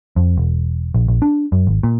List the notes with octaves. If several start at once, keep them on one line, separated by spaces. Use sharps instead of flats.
F2
E1
A#1
A#1
D4
F#2
G#1
A#2